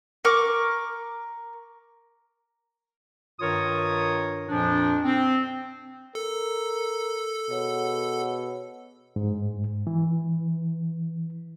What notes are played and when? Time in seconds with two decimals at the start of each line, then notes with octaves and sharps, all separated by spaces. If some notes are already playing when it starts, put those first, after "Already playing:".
0.25 A#4 C#6 D6
3.40 G2 D#3 F4 A#4 C#5 D#6
4.49 F2 A#2 F3 D4
5.05 C4
6.15 A4 A#4
7.50 B2 G#4 C#5 F#5
9.16 G#2
9.87 E3